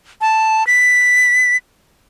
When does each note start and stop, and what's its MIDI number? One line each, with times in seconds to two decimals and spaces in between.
0.21 0.66 81
0.67 1.57 95